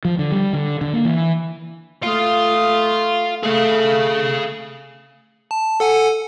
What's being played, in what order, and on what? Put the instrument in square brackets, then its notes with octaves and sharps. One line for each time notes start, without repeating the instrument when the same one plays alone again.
[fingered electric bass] F3
D3
G3
D3
D3
A#3
E3
[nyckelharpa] A3 D#6 [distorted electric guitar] F5 C6
[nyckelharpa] A3 [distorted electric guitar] G#4 F5
[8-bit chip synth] A5
A4 F#5 G#5